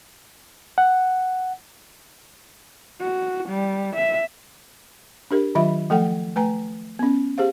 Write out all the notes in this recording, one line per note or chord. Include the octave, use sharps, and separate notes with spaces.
F#5
F#4
G3
E5
D4 G4 A#4
D#3 F#3 F4 E5 B5
F3 A3 A4 F#5 G5
A3 B4 G#5 A#5
B3 C#4
G4 G#4 C5 F5